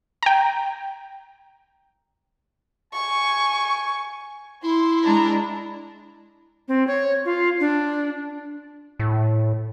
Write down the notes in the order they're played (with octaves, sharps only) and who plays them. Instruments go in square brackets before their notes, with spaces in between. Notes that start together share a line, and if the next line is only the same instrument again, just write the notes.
[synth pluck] G5 A#5
[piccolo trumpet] G#5 [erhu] C#6
[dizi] E4 [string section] C6
[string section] G#3 D4 A#5
[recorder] C4
C#5
F4
D4
[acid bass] A2